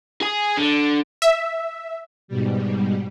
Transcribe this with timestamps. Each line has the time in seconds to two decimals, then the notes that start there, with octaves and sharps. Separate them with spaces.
0.22 G#4 G#5
0.58 D3
1.22 E5
2.28 G#2 B2 G3